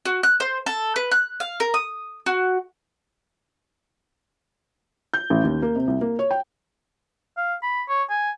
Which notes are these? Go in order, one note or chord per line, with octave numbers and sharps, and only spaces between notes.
F#4
F#6
C5
A4
B4
F#6
F5
A#4
D#6
F#4
G6
A1
D#2
A#3
C3
C2
A#3
C#5
G5
F5
B5
C#5
G#5